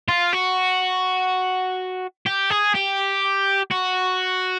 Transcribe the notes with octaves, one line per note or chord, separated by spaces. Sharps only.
F4
F#4
G4
G#4
G4
F#4